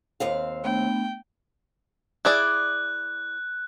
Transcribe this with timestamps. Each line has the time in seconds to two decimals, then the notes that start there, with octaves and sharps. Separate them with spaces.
0.20 D#2 C4 F5
0.64 A3 B3 D4 G5
2.25 E4 G#4 D5 F#6